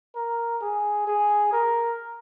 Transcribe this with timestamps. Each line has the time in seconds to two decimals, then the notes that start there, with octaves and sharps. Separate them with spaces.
0.15 A#4
0.62 G#4
1.08 G#4
1.53 A#4